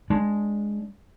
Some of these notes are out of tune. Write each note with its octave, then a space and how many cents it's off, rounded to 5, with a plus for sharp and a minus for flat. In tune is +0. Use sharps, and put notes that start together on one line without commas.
G#3 +0 D4 -5